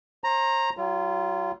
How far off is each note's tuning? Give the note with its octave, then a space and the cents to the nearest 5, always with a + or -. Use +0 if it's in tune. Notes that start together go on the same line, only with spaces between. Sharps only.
C5 +40 A#5 +0
F#3 +35 F4 -25